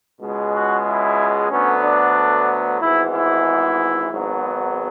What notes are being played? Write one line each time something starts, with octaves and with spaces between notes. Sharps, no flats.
C#2 B2 G#3
F#4
E4
D2 D3 F#3 B3 C#4
D4
G#1 G#2 E3 B3 E4
E4
G#1 G#2 F#3 B3